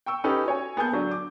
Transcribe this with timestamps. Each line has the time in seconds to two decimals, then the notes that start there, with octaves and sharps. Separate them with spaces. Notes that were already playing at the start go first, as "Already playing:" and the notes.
0.06 G5 C#6 E6
0.24 C#4 D#4 G4 A4 B4
0.46 F#4 C#5 G#5
0.76 A#3 B3 G#4 G#5 A5 G6
0.92 D3 F#3 D4
1.11 D6